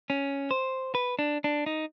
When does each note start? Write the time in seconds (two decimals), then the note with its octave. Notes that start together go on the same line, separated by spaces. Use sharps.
0.10 C#4
0.51 C5
0.95 B4
1.19 D4
1.44 D4
1.66 D#4